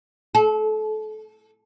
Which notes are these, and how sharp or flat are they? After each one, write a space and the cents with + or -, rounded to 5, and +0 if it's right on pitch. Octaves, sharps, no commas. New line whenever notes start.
A4 -30